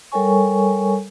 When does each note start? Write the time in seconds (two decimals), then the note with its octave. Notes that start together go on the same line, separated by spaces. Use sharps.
0.12 G3 A4 A#4 C#5 G#5 C#6